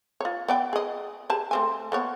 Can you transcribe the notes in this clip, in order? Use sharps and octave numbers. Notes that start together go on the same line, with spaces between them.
F4 C#5
B3 D5 G5
G#4 D#5
G4 G#4 A5
A3 C4 G#5
A#3 B3 C#5